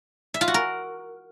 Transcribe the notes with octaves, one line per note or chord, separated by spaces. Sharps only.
E5
F4
F#4
A#4